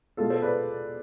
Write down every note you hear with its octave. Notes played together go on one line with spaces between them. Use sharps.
B2 G#3 F4 A4
A4 C5
B4 D5